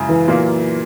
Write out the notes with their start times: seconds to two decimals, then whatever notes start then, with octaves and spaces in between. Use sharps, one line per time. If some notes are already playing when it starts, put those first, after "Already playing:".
Already playing: F#2 C#3 G#3 E4
0.08 E3
0.28 A#2 F#3 A#3